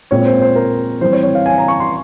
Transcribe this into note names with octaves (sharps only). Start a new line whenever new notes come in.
A#2 G#3 C4 C#5
C5
C5
A#4
E3 G3 C4 C5
C#5
C#5
F5
G#5
A#5
C#6
C6